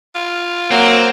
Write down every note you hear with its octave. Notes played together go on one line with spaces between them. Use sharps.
F4
F#3 A#3 C4